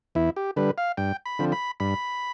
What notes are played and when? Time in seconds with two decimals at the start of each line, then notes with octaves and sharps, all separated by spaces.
0.15 E2 E4
0.36 G4
0.56 D3 G3 B4
0.78 F5
0.97 G2 G5
1.26 B5
1.39 D3 F3 C4
1.52 B5
1.80 G2 B5